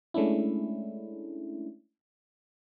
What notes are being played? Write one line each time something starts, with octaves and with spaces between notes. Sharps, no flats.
G#3 A3 C#4 D4 E4